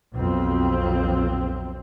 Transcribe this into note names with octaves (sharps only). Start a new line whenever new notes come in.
B1 F2 C4